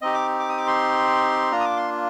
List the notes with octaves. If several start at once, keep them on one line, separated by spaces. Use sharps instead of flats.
C4 D#4 G4 D#5
D6
D6
D#6
D6
C6
A#3 D4 F4 A#5
D#6
D6
C6